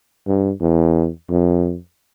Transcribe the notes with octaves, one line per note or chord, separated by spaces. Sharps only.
G2
E2
F2